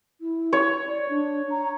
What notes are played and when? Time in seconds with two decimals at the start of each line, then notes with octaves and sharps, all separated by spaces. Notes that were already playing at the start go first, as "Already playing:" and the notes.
0.21 E4
0.53 C#5
0.88 D5
1.09 D4
1.50 A#5